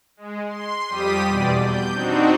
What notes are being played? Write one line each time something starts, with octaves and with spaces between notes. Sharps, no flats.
G#3
C6
F2 G3 G4 D#6 B6 D#7
E2 B2 D5
G6
C4 D4 D#4 F#4